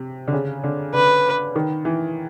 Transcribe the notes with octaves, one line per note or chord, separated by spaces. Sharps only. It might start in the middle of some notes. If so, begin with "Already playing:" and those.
Already playing: C3
D3
C#3
D3
D3 B4
D#3
E3